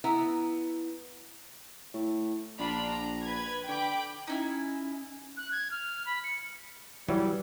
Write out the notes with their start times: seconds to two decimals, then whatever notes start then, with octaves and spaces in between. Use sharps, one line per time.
0.04 B3 E4 A#5
1.94 A2
2.59 A#1 D4 F4 B5
2.90 A#5
3.24 B4 G#6
3.68 D3 G5 B5 D6
4.27 C#4 D#4 E4 G#5
5.37 F#6
5.52 G#6
5.71 F6
6.06 B5
6.23 C#7
7.09 E3 F#3 G3